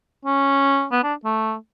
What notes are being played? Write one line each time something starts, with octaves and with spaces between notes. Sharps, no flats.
C#4
B3
D4
A3